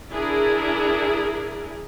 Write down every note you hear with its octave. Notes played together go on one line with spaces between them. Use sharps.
D4 E4 G#4 A#4